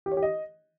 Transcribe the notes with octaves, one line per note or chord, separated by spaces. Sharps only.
G4
C#5
G4
D#5